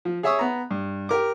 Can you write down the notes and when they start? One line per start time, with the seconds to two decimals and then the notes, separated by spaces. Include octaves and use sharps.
0.05 F3
0.23 G#4 C#5 E5 C#6 D#6 E6
0.39 B3 A#5
0.71 G2
1.09 G4 A#4 D6